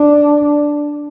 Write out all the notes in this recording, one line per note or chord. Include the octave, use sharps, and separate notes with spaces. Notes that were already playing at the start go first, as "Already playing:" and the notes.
Already playing: D4